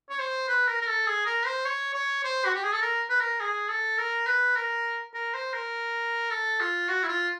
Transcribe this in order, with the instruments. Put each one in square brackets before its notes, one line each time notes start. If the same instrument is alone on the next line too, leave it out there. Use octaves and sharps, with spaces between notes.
[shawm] C#5
C5
B4
A#4
A#4
A4
G#4
A#4
C5
C#5
C#5
C5
F#4
G4
G#4
A4
A#4
B4
A#4
G#4
A4
A#4
B4
A#4
A#4
C5
A#4
A4
F4
F#4
E4
F4